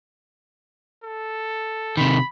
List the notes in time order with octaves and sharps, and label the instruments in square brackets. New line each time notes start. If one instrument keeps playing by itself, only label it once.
[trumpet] A4
[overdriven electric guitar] C3 D#3 [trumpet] B5